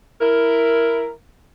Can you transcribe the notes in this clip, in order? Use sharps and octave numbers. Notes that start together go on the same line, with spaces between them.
E4 A#4